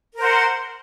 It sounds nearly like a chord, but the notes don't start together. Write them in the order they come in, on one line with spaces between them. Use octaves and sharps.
A#4 C5 F#5